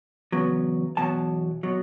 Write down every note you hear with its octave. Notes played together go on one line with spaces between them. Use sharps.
E2 C#3 F#3 B3
E2 B2 F#3 A5
B2 F#3